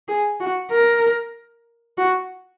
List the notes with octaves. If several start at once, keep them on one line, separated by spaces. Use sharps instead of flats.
G#4
F#4
A#4
F#4